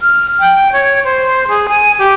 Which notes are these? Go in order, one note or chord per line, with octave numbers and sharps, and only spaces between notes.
F6
G5
C#5
C5
G#4
G#5
G4